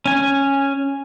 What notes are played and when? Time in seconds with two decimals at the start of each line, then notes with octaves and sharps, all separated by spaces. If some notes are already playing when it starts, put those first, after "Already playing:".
0.06 C#4 G#5